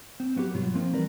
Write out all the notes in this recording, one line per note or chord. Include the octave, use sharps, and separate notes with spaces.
C4
F#3 B3 C#4 G4 G#4
G2 B2 F#3 F4
F3 A#3 C4 D#4
E3 G3 A#4 B4 D5